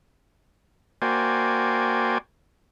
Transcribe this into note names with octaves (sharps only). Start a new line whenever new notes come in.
A#3 F#4 C5 D5 G5 G#5